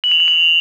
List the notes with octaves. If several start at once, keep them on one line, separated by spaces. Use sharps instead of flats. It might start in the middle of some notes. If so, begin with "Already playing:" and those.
F#7
F7
F#7
F7